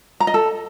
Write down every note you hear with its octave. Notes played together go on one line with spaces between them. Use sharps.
A#5
D#5
A4